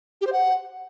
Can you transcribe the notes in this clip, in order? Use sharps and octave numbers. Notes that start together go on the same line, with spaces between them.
G4
C5
F#5